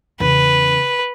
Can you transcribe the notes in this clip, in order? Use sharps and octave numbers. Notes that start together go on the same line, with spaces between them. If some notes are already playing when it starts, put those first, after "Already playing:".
E2 C#3 B4